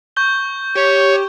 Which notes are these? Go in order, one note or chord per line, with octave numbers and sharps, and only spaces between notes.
C#6 G6 G7
G4 C#5